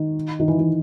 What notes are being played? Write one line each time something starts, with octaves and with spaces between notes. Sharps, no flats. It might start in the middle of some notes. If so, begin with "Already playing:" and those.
Already playing: D#3
D#3
E3
D#3